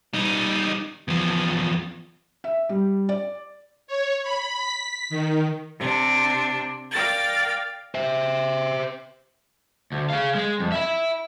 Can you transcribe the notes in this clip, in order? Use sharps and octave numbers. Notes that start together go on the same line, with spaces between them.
G3 D#4
E2 F3
E5
G3
D5
C#5
B5
B6
D#3
C3 D4
A#4 D5 F5 G5 A6
C5 E5
D2
G#4 F5
G#3
F2
E5 B5